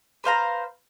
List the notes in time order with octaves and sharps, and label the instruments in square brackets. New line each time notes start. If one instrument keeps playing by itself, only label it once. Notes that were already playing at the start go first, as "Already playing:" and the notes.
[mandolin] B4 C5 F5 A#5